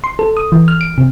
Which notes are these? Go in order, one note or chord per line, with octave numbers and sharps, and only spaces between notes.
C6
A4
D#6
E3
F6
D7
C3